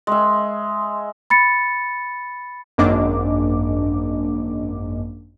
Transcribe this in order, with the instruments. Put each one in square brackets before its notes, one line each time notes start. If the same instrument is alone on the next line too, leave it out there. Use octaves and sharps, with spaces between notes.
[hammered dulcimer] G#3 E5
[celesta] B5 A6 C#7
[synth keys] G#1 F#2 A#3 D4 D#5 D6